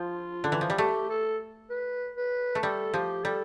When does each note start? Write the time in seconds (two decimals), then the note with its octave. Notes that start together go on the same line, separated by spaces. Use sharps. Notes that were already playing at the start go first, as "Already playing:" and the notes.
Already playing: F3 F4
0.44 D3
0.52 E3
0.61 F3
0.70 G3
0.78 A3 G4
1.09 A4
1.70 B4
2.17 B4
2.55 A3
2.63 G3 A4
2.94 F3 G4
3.24 G3 A4